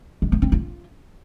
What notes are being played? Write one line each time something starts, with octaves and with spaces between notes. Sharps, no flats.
G#3
B3
C4
F4